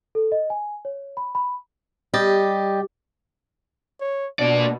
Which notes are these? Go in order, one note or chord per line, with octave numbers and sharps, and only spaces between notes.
A4
D#5
G#5
C#5
B5
B5
G3 G4 D#5 A6
C#5
B2 A#3 D4 D5